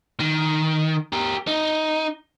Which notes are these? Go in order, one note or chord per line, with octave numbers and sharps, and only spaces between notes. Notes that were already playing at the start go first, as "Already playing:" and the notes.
D#3
G4 A#4
D#4